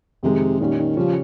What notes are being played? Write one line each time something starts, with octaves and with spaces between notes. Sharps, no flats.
F2 C3 D#3 G#3 D#4
A#2 D#3 G3 C#4
D#3
C#3 F3 G3 C#4